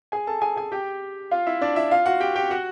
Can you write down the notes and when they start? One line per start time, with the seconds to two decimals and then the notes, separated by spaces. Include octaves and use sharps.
0.12 G#4 G#5
0.27 A4 A5
0.42 G#4 G#5
0.56 G#4 G#5
0.72 G4 G5
1.31 F4 F5
1.47 E4 E5
1.61 D4 D5
1.76 E4 E5
1.91 F4 F5
2.06 F#4 F#5
2.20 G4 G5
2.36 G4 G5
2.51 F#4 F#5